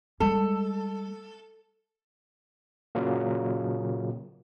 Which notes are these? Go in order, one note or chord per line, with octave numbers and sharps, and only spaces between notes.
G3 G#3 A4
A#2 C#3 F#3 A#3